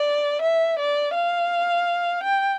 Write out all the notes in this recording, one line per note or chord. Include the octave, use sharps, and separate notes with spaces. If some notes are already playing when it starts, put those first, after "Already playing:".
Already playing: D5
E5
D5
F5
G5